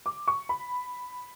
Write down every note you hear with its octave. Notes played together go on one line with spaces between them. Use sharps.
D6
C#6
B5